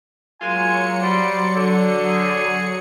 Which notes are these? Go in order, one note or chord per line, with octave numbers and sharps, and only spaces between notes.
F#3 G#3 A#3 F4 G#5 C#7
G3 C5 D5
D3
G#4